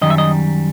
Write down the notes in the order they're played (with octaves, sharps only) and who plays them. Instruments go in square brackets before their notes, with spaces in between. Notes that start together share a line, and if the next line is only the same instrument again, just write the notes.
[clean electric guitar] F#2 D#3 G3 D#5
E5
D#5